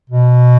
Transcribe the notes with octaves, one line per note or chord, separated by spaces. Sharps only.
B2